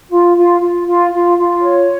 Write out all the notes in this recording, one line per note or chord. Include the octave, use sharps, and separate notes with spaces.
F4
F4
F4
F4
F4
F4
C#5